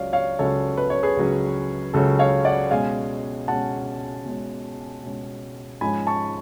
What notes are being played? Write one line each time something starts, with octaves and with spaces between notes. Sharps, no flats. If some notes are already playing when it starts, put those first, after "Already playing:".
Already playing: C#2 C#3 F#3 C#4 C#5 D5 F5
C#5 F5
C#2 C#3 F#3 C#4 A4 C#5
B4
C#5
G#4 B4
C#2 C#3 F#3 C#4
C#2 C#3 F#3 C#4 A4 C#5
C#5 F5
D5 F#5
B2 G#3 C#4 F5 G#5
B2 G#3 C#4 F#5 A5
B2 G#3 C#4
B2 G#3 C#4
G#2 F3 G#3 C#4 G#5 B5
A5 C#6